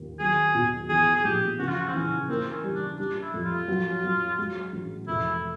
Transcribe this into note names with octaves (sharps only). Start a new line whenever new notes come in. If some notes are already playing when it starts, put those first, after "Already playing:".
Already playing: D#2
F#3 G#4
B2
E3 G#4
G#4
A#1 G4
C#3 F#4
F4
F#4
C4
E3 C#4
A#3 C4
C#4
G3
D4
G3 D4
E4
F2
F4
F#3
F#3
G#3
A1
F1 E4